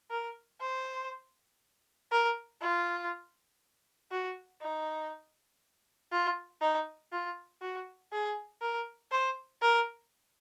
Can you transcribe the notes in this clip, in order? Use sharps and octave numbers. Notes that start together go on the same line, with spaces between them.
A#4
C5
A#4
F4
F#4
D#4
F4
D#4
F4
F#4
G#4
A#4
C5
A#4